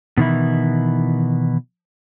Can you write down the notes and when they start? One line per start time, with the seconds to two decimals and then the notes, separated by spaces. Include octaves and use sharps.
0.17 B2 D#3 E3 E4